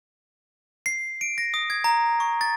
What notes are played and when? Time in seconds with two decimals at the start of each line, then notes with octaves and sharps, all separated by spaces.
0.86 C7
1.21 D7
1.38 A#6
1.54 D#6
1.70 G#6
1.84 A#5
2.20 C#6
2.41 A6